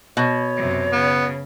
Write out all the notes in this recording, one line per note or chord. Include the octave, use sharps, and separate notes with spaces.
B2 C#5
F#2 C3
C#3 B3